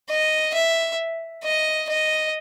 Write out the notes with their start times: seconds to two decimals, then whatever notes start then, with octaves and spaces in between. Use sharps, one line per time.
0.10 D#5
0.54 E5
1.44 D#5
1.89 D#5